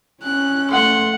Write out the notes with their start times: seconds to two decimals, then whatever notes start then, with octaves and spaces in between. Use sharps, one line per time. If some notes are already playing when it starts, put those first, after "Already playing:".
0.23 C#4 F#6
0.71 A3 F#5 C6